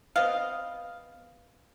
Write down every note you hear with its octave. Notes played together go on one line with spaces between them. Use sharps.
B3 C4 D#5 F5